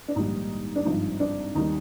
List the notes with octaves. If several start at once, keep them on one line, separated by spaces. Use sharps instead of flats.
D4
A#1 G#2 D#3 G3 D#4
D4
G#1 G2 F3 D#4
D4
D#2 D#3 G3 D#4